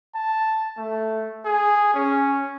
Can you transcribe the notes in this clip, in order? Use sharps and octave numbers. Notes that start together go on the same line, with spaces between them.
A5
A3
G#4
C#4